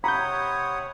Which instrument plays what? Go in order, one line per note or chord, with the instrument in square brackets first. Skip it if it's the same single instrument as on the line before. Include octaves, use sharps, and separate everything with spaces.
[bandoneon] C3 F#5 D#6 [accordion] C#5 [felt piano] A#5 [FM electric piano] B5 G6